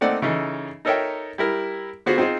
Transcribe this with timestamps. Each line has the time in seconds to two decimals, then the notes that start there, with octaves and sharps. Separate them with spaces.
0.01 A3 A#3 C4 D#4 D5 F#5
0.22 C#3 E3 D#4 A4
0.85 D#4 A4 A#4 C#5 E5 G5
1.38 G3 E4 A#4
2.06 D3 B3 F4 F#4 G#4 C5
2.18 C4 D#4 F4 G#4 C5